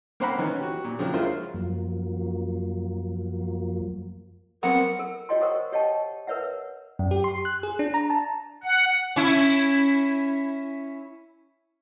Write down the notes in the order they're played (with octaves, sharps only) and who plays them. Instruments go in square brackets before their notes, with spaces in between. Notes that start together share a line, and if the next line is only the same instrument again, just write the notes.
[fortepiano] A#3 C4 C5 F#5 A#5 B5
D#3 E3 C#4
F#4 G4
A#2
C#3 F3 F#3 C4 D4
F#3 G#3 E4 F4 A#4 C5
[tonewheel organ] F#2 F3 F#3 A#3
[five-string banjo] F#3 B3 C4 [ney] A#4 [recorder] F#5
[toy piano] A4 A#4
F#4 G#4 C#5 D#5 G5 C6
A#4 C5 F#5 C#6 D#6
G4 C#5 D#5 F#5 G5 A5
A#4 B4 C#5 E5 F#5
[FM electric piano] F#2
G4
C6
F#6
G#4
D4
A#5
A5
[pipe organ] F#5
[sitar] C#4 E4